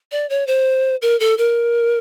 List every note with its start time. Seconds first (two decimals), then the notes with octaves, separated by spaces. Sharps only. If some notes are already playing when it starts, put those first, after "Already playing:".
0.12 D5
0.30 C#5
0.47 C5
1.02 A#4
1.20 A4
1.38 A#4